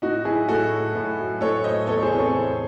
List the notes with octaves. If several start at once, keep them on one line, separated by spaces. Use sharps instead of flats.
A2 D#4 F#4
F#3 E4 G#4
A2 F#4 A4
F#3
A2
F#3
A2 A4 C#5
F#3 C5 D#5
E2 A4 C#5
G#4 C5
C3 E3
A4 C#5
E2